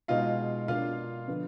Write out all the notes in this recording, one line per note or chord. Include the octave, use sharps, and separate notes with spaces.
B2 G#3 D#4 F4 F5
B2 A#3 D4 F4 F5
D3 F3 B3